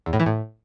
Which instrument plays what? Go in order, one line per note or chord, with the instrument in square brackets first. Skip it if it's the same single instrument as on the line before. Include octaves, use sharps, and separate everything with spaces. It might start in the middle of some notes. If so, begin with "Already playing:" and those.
[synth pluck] E2
A2
E3
A2